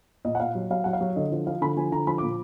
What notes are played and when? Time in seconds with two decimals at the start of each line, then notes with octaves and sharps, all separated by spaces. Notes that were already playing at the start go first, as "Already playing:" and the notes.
0.25 A#2 D#5
0.35 F#5
0.40 A#2 F5
0.55 F#3
0.70 F#3 F5
0.84 F#3 F#5
0.93 F5
1.01 F#3
1.16 D3 D#5
1.32 F3
1.46 F3 F5
1.61 D3 B5
1.76 F3 G#5
1.92 D3 A#5
2.07 F3 B5
2.18 A#2 D6